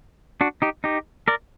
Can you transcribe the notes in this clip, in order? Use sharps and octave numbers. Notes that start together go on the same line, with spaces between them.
D4 F#4
D#4 G4
D#4 G4
A#4 D5